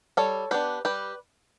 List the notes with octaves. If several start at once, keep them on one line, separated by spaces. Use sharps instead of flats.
G3 A4 C#5
B3 D4 G4 B4
G3 G4 B4